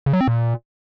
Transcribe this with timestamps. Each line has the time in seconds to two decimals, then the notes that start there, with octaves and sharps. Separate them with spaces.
0.06 C#3
0.13 F#3
0.20 C4
0.28 A#2